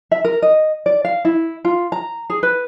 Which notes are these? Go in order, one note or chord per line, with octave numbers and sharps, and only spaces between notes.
E5
A#4
D#5
D5
F5
E4
F4
A#5
G#4
B4